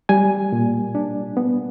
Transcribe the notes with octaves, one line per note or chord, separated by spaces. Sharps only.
G3 G#5
A#2
D4
B3